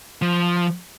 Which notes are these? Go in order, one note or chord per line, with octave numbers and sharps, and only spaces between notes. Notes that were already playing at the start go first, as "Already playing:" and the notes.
F3